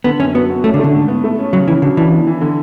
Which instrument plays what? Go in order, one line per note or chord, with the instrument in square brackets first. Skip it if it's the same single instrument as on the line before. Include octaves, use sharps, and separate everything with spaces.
[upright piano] D3 [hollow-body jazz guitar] B3
[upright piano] F#2 [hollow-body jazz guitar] C#4
[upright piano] F#3 [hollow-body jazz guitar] B3
[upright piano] F#4
[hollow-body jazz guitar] A3 [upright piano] C#4
[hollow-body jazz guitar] D3
[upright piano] A3
[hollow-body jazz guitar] D3
[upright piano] G#2
B3
A3
C#4
[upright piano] C#3 [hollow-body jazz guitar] F#3
[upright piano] C#3 [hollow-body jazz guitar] E3
[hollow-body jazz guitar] D3 [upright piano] F#3
[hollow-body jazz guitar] E3 [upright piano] D4
[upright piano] B3
E3
D3